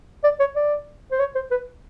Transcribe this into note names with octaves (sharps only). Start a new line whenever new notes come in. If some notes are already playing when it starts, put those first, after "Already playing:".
D5
C#5
D5
C5
C#5
C5
B4